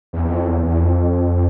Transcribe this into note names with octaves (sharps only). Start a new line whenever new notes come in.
E2
E2
F2
E2
E2
F2